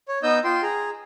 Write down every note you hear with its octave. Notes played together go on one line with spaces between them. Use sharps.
C#5
B3 D#4 D#5 E6 G6
F4 G5 C6
G#4 A#5